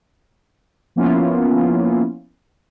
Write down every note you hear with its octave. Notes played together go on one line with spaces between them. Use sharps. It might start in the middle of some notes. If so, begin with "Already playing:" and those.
F3 A#3 B3 C#4 E4 F4